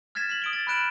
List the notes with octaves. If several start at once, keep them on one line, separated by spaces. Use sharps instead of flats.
F6 G#6 A6 B6 E7
B6 F7 F#7
D#6 D7 G7
A6
B5 F6 F#6 D7 E7